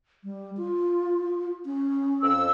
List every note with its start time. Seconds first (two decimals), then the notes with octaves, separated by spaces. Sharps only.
0.24 G3
0.57 F4
1.65 C#4
2.22 F2 E6